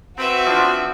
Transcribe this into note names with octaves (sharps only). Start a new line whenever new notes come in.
C4 F#4 B4 E5
F3 C4 D4